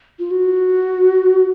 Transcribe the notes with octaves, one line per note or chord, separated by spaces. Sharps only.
F4
F#4